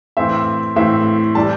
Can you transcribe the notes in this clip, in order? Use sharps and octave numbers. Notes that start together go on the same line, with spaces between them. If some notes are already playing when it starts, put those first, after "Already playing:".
A2 E3 C4 E5
A2 E3 C4 E5
E3 G3 A5